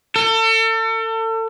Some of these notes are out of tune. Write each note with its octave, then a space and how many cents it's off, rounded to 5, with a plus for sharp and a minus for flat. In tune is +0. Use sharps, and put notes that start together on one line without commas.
A4 +35